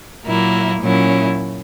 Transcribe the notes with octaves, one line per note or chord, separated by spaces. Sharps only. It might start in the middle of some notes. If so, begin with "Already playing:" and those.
A#2 F#3 A#3 E4
A#2 F#3 C#4 E4